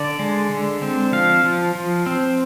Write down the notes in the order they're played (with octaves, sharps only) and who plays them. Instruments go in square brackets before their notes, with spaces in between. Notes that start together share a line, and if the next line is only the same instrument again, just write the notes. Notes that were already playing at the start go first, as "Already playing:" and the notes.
Already playing: [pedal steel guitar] D3 D5
G#3
D3
C4
F3 F5
F3
F3
C4